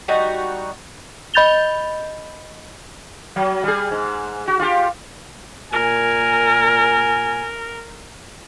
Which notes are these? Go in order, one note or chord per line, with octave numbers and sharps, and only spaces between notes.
G3 D#4 F#4
D#5 B5 G6 A6 F7 G7
F#3
G3 G#4
G#2
F#4
F4 G4
A#2 A#4 G#5